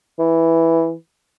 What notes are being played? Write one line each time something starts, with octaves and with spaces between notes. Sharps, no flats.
E3